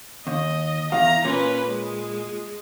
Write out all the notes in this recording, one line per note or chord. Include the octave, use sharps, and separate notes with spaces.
D#2 D#5
E2 F5 A#5
A#2 C#4 B4
G#3